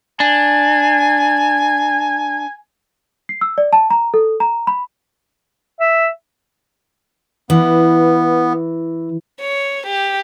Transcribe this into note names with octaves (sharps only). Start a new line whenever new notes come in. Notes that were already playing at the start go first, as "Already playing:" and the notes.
D4 G#5
C7
E6
D5
A5
A#5
A4
A#5
B5
E5
E3 B3
C#5
G4